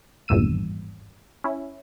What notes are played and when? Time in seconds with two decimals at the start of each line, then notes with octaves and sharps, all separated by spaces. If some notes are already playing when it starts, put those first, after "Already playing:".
0.28 G#1 E2 G2 A#2 E6 D#7
1.44 C#4 E4